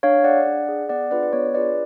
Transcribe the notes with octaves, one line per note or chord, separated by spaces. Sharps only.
D4 C#5 F5
G#4 D5 F#5
D4
G#4
B3 D5 F#5
D4 F4 G#4 B4 D5
B4
B3 C#5
D4 F4 G#4 B4 D5